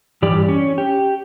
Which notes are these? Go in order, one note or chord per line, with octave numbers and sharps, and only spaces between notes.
G2 E3 G4 D5
C#4
G4